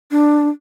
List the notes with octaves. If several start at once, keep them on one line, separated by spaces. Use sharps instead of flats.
D4